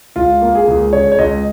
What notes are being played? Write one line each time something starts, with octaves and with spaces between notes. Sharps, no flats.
C#2 F4
A#3
G#4
C#2
C#3 C#5
C#5
C#2 D#5